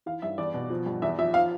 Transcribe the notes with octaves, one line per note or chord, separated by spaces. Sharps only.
E3 F5
G2 E5
E2 D5
B2
F3
G2
E2 E5
F3 E5
F3 F5